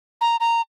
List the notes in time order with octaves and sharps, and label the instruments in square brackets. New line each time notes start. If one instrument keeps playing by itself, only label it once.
[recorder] A#5
A#5